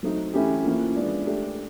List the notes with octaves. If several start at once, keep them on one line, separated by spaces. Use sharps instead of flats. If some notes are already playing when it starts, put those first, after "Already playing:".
F#3 A3 C4 D#4
E3 A3 C#4 E4 G4
F3 A#3 C#4 E4
G#3 B3 D4 F4
A3 D4 G4